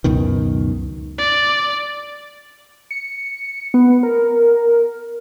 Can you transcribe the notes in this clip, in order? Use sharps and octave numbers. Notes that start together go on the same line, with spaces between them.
C#2 F#2 B2 D#3
D5
C#7
B3
A#4